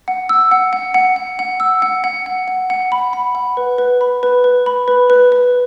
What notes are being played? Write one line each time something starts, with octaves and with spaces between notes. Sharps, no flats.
F#5
E6
F#5
F#5
F#5
F#5
F#5
E6
F#5
F#5
F#5
F#5
F#5
B5
B5
F#5
B4
B4
B5
B4
B4
B5
B4
B4
B4